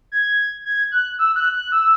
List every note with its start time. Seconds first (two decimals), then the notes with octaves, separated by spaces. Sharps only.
0.12 G#6
0.65 G#6
0.92 F#6
1.19 E6
1.36 F#6
1.54 F#6
1.72 E6